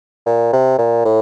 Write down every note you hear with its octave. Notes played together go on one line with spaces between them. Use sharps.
A#2
C3
A#2
A2